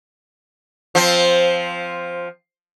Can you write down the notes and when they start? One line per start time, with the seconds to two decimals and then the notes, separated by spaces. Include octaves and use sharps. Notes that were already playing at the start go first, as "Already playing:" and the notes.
0.95 F3 C4